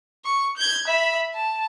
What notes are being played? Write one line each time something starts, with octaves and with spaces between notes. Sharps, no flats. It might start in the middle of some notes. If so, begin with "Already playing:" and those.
C#6
G6 G#6
E5 B5
A5